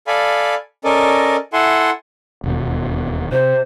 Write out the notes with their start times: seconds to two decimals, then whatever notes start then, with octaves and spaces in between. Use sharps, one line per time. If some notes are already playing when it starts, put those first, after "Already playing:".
0.07 A4 D5 F5 G#5 B5
0.84 C#4 A4 A#4 D5 D#5
1.53 E4 A4 E5 F#5 G#5 C6
2.44 E1 D#2 B2
3.32 C3 C5